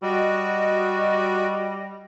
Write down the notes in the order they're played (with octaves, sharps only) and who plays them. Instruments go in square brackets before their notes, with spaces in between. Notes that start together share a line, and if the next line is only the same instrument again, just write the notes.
[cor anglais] G3 [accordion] F#4 [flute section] D#5